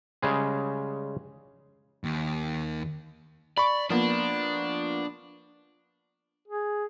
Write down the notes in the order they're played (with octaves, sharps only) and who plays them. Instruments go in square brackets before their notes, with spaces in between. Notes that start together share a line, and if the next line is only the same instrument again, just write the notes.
[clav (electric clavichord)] C#3 G3 G#3 G#4
[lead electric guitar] D#2
[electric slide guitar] D5 [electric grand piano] B5 C#6
[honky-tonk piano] F3 A#3 B3 [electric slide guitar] D4
[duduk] G#4